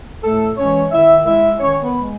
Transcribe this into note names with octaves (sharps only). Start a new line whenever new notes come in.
A2 A3 A4
E3 G#3 C#4 C#5
D#3 E4 E5
G#3 E4 E5
D#3 C#4 C#5
B3 B4
G#3